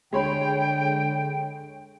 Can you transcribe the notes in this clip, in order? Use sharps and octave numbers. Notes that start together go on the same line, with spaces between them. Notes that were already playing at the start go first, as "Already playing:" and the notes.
D3 G#3 C#5 G5 B5